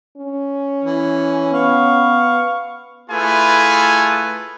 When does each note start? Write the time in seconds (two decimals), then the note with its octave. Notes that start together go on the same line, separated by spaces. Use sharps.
0.17 C#4
0.84 E3
1.53 B3 F5 C#6
3.10 A3 E4 F4 G#4 B4 G#5